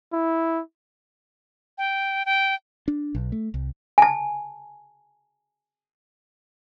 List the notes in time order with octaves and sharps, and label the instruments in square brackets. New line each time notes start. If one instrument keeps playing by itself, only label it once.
[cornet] E4
[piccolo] G5
G5
[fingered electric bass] D4
B1
A3
C2
[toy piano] G#5 A5